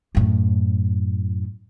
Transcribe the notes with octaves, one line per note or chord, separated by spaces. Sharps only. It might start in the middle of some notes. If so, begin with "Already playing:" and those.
F#2 A2